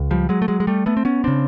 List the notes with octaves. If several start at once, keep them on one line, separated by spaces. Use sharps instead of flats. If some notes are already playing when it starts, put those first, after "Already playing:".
Already playing: C#2
F3 G3
F#3 G#3
A3
F#3 G#3
G#3
G3 A3
A3 B3
C4
B3 C#4
C#3 C4 D4